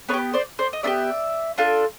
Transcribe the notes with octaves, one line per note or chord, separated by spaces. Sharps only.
B3 D4 B4 C#5
G4
C5 D5
C5 D5
D#5
B3 D4 G4 D5 E5
D4 F4 A4